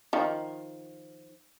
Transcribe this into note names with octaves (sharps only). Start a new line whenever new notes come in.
D#3 F3